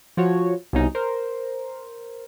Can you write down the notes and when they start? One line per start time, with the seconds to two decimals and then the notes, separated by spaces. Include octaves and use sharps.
0.17 F3 F#4 C#5
0.73 C2 B2 C#4 D#4
0.95 A#4 C5